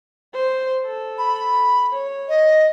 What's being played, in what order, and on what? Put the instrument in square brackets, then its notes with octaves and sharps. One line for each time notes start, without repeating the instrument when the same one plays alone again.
[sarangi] C5
A4
[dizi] B5
[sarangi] C#5
[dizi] D#5